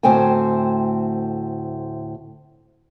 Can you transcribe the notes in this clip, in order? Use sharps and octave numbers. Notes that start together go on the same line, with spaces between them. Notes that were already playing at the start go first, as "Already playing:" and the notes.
D2 A2 C4 C5 G5 G#5